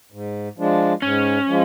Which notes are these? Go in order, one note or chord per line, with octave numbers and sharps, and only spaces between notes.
G#2
F3 G#3 D4
G#2 C#4
F3 G#3